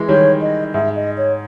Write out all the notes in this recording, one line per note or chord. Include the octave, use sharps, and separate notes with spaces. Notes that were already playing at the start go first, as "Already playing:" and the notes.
Already playing: E3 G#3
D#3 G3 C#5
D#5
G#2 E5
D#5
C#5